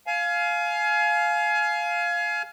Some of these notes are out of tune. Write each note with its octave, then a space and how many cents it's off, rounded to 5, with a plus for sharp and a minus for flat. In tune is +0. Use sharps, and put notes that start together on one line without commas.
F5 +0 G#5 +30